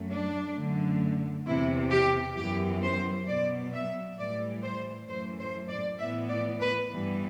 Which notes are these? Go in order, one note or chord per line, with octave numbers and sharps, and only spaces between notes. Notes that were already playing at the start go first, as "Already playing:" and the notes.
Already playing: F#2 F#3 A3
D4
F#2 D3 A3
E2 C3 E3 E4
G4
F#2 E3 B3 G4
C5
B2 F#3 B3 D5
E5
A2 E3 G3 D5
C5
F#2 E3 A3 C5
C5
D5
A2 E3 B3 E5
D5
B4
G2 E3 G3 B3